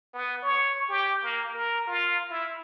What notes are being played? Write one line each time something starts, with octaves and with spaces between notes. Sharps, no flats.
B3
C#5
G4
A#3
A#4
F4
E4